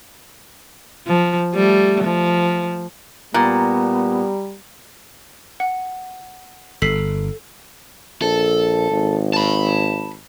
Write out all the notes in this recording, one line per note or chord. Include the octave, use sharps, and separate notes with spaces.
F3
G3 A3
F3
A#2 G3 B3 A#5
F#5
G1 A4 B6 C7
A#1 A4
G#1
A5 B5